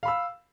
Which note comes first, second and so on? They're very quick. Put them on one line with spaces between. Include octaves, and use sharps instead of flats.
F5 B5 E6